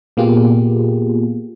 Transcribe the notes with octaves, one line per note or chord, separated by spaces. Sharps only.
A#2 A#3 B3 F4 G4 G#4